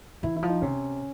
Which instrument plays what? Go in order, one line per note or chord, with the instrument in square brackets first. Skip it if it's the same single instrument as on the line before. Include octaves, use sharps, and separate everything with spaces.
[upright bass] E3 [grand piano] E4
[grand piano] E4
[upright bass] F3
[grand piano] D#4
[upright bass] C3 [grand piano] C#4